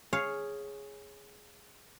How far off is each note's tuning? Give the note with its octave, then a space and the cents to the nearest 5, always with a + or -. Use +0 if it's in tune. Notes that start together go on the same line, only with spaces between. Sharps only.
G#4 +0 C#5 -5 F5 +0